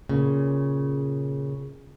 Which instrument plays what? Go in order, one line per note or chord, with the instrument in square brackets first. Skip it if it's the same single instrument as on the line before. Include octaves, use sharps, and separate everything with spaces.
[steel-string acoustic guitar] A#2 C#3